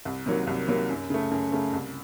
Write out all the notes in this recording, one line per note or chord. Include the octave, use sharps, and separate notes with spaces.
C2
C3 D#3 F#3 A#3
C2
C3 D#3 F#3 A#3
F#2
C#3 A3
F#2
C#3 A3
C2